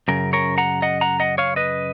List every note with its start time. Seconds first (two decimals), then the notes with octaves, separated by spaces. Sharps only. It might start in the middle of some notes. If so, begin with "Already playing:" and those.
0.08 F#2 C#3 A#4
0.33 A#4 C#5
0.58 F#5 A#5
0.82 D#5 F#5
1.01 F#5 A#5
1.20 D#5 F#5
1.38 C#5 F5
1.56 B4 D#5